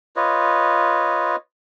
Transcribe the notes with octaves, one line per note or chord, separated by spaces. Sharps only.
F4 B4 C#5 D#5